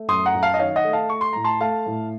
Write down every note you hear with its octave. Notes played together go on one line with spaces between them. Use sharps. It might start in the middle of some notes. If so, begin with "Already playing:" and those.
Already playing: A3
F#2 C6 D#6
F#5 A#5
F#2
F5 A5
D#5
D#3 C#5 F5
D#5 F#5
A3
F5 A5
A3 C#6
C6
A2 A#5
A5 C6
A3 F5 A5
A2